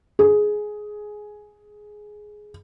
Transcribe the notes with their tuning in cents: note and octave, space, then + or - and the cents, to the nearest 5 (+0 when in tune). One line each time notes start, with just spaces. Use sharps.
G#4 +10